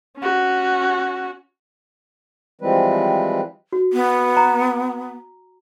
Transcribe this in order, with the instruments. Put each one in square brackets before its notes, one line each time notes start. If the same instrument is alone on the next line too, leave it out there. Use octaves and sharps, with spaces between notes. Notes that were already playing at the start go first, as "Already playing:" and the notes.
[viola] C#4 F#4
[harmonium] E3 F3 G3 G#3 C4 B4
[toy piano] F#4
[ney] B3
[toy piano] A#5